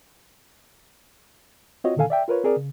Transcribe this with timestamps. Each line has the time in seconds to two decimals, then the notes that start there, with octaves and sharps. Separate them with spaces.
1.84 C4 F4 F#4 C#5 D#5
1.96 A#2 D3 D#3 A4 F5 G#5
2.10 D5 E5 G5
2.28 F4 A#4 B4 C#5
2.44 C4 G#4 A#4 D5
2.56 C#3